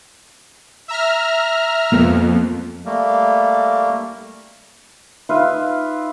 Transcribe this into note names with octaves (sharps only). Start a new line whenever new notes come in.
E5 A#5 F6
F2 G#3 A#3 B3
G3 A3 A#3
D#4 F4 B4 E5